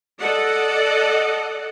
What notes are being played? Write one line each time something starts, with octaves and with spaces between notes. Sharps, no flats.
A4 D5 D#5 F#5